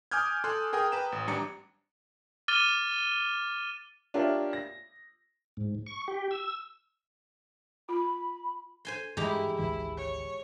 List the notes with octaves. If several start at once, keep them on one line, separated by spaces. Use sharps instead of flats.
G#5 D6 D#6 F6 G6 G#6
A4 G#5 C6 F#6
G#4 A#4 G5 G#5 D#6
B4 G5 A#5 E7
A1
G#1 G3 D4 A#5 D6 C#7
D6 F6 A6 D#7 G7
D4 F4 G4 A#4 C#5 E5
A#6
G#2
C#6
G4
E6
F4 B5
C5 G#5 C6
G2 E3 G#3 E4 G4 A#5
G#1 D2 E3 E4
C#5